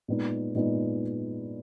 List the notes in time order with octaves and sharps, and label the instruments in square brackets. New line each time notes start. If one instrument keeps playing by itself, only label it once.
[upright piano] A#2 G#3 B3 D#4
A#2 G#3 B3 D#4